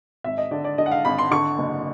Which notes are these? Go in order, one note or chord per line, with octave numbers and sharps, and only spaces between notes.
G#1 E5
D#5
D3 D5
D5
D3 D#5
F#5
F5
G#1 B5
C6
D3 C#6
F#1